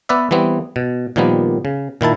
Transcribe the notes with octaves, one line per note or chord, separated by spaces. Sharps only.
B3 B4 D5 E5
E3 G3 B3 C4
B2
A#2 D#3 F3 G3 B3
C#3
A#2 D#3 E4 A5